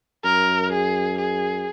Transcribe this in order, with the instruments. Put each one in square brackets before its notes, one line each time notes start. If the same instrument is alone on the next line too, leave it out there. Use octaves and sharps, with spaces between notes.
[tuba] F#2 [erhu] A#4
[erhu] G#4
G#4